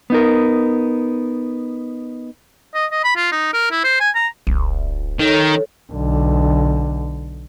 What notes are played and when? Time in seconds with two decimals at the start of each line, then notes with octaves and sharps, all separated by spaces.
0.10 B3 D#4 A#4
2.74 D#5
2.92 D#5
3.04 B5
3.17 F4
3.32 D#4
3.54 A#4
3.71 E4
3.84 C5
4.00 G#5
4.15 A#5
4.47 D1 B1
5.19 D#3 A4 C#5
5.92 B1 D3